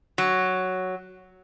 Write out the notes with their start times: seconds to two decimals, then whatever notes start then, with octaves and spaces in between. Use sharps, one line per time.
0.18 F#3